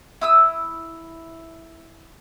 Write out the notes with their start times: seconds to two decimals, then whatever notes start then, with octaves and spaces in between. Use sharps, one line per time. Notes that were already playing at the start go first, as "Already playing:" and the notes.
0.21 E4 D#6 E6